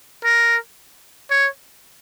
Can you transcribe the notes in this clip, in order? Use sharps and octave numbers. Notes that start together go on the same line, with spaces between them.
A#4
C#5